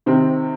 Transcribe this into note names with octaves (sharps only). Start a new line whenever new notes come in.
C3 D#3 C4